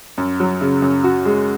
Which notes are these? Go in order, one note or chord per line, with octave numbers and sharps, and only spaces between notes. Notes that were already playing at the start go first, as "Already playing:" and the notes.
F#2
F#3
C#3
F#2
F#4
G#3